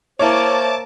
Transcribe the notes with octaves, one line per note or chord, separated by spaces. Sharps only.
A#3 E4 C5 C#5 A5 D6